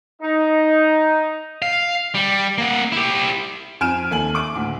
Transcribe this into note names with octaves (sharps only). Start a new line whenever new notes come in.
D#4
F5
G3
A#3 F#5
E4 G4
F2 G#5 F6 D7 E7
D#2 A4 G#5 F#7
C#6 D6 D7 F#7
D2 A2